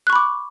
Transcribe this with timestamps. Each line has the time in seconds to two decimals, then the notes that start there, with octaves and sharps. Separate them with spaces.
0.07 F#6
0.10 C#6
0.13 B5
0.16 D6